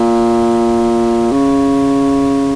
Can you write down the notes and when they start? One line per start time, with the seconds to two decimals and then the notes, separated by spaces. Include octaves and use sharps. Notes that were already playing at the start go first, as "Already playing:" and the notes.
Already playing: A#2
1.32 C#3